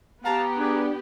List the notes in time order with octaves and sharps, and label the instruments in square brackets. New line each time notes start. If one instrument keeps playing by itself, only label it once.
[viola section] B3 G4 [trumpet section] F5 A5 [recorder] A#5
[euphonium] D4 [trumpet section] G#4 B4 D5